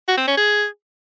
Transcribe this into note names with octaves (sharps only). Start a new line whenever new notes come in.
F#4
C4
C#4
G#4